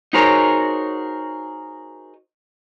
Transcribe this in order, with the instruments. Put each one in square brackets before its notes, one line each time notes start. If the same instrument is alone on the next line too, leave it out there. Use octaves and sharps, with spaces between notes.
[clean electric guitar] D#4 F#4 G#4 A#4 C5 C#5